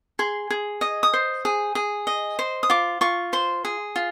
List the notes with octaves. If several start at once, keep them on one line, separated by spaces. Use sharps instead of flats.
G#4 C6
G#4
D#5 D#6
D#6
C5
G#4
G#4
D#5
C5
D#6
F4 D6
F4 C#6
C5 C6
G#4
F4